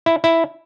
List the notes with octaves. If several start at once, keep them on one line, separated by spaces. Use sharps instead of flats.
E4
E4